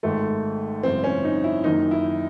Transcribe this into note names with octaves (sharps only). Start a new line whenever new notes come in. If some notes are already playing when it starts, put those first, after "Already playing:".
G#1 G#2 D#3 A3
G#1 F#2 C#3 E3 C4
C#4
D#4
E4
F#1 F#2 D#3 D#4
E4